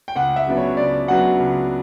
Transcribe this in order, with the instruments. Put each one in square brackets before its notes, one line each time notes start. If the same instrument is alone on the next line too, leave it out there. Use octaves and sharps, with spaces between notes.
[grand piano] G5
C#2 F#5
E5
C#3 F#3 B3 D4
C#5
C#2 D5
C#3 F#3 B3 D4 F#5
C#2